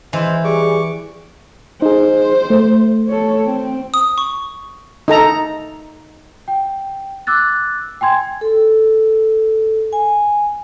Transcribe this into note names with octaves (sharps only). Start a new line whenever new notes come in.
E3 G#3 C5
G3 G#4 C#6 D6
D#4 G#4 C5
A3
A4 C#5
C4
D#6
C#6
D#4 A4 A#5
G5
D6 E6 F#6 A6
G5 G#5 C6 G#6
A4
G#5